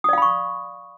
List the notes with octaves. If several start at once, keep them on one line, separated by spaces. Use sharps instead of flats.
D5 F5 B5 C#6 D#6